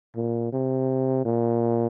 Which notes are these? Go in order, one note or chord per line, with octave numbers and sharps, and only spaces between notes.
A#2
C3
A#2